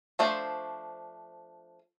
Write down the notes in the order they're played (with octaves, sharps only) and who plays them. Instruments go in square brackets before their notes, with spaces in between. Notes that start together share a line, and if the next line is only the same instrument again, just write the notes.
[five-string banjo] F3 A3 D4 C5